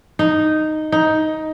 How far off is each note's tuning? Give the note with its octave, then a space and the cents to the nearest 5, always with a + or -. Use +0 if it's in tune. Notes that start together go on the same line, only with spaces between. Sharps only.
D#4 -5
D#4 +10